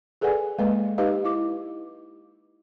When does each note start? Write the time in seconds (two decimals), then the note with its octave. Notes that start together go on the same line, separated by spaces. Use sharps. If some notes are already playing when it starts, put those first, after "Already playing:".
0.21 G#4 A4 B4 D5 F#5 G#5
0.59 G#3 A#3 B4 D#5
0.98 D#4 G4 B4 D#5 F5
1.24 E4 D6